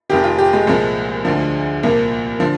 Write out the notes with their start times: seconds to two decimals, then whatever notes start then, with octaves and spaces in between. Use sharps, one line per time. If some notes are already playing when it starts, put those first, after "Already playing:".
0.09 F1 F2 D#3 G4
0.24 F4
0.38 G4
0.53 G#3
0.67 C2 A#2 F3 G#3
1.25 D2 D3 F3
1.83 C2 A#2 F3 A#3
2.40 D3 F3